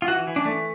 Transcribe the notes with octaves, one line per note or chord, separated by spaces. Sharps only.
F4
E3 F#4
E3
D4
A3